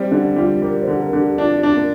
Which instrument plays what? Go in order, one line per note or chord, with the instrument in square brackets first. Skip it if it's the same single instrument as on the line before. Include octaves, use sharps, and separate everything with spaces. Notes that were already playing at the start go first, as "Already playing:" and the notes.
Already playing: [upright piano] G3 [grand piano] C4
[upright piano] D3 [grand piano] D4
[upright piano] G3 [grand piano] F4
[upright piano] G3 [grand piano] A#4
[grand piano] C5
[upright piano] D3
[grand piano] A#4
[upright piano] D3
[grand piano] G4
[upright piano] D4 [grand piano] F4
[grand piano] G4
F4
[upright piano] D4
[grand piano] A#3